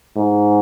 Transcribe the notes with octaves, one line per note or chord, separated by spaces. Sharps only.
G#2